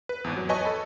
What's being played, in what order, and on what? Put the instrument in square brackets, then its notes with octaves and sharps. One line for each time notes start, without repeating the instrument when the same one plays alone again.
[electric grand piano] B4
G#1 E2
F#3
B4 C#5 D#5 G#5 A5 C#6
A4 B5